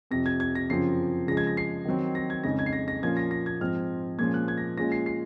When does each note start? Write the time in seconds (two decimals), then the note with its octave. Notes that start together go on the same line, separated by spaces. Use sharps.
0.11 F2 C3 F3 A#6
0.26 G#6
0.40 G#6
0.55 A#6
0.69 F#2 C#3 F3 C4 F4 C7
1.27 C#3 F3 G#3 A#6
1.37 G#6
1.47 A#6
1.57 C7
1.85 D#3 F#3 C4
2.15 A#6
2.30 G#6
2.44 F2 C#3 G#3 D#4 A#6
2.59 G#6
2.66 C7
2.73 A#6
2.88 A#6
3.03 A#2 F3 A#3 C#4 F4 G#6
3.17 A#6
3.31 A#6
3.46 G#6
3.60 G#2 F3 C4 F4 F6
4.19 A#2 F3 G#3 C#4 F4 G#6
4.34 F#6
4.48 G#6
4.58 A#6
4.77 A#2 G#3 C#4 F4 A#6
4.92 C7
5.06 C7